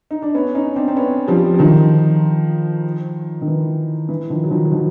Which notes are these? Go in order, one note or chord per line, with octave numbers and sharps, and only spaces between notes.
D#4
D4
B3 C#4
C#4 D#4
C4 D4
C4
B3 C#4
F3 G3
F#3
D#3 F3
D#3
E3
E3
D#3 F3
F#3
D#3 F3
F#3
D#3 F3